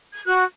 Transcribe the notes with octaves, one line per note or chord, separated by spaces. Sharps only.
G#6
F#4 F#6